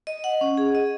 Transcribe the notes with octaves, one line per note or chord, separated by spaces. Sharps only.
D#5
F#5
C#4
G#4
D#5